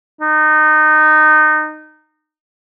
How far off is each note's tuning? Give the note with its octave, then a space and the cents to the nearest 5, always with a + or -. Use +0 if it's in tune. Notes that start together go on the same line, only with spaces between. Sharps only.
D#4 -20